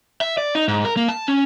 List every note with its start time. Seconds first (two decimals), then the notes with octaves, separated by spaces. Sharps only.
0.21 E5
0.37 D5
0.55 D#4
0.68 G#2
0.85 A#4
0.96 A#3
1.09 A5
1.28 C#4